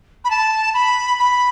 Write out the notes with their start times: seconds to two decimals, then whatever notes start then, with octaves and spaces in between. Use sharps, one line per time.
0.25 B5
0.30 A5
0.74 B5
1.19 B5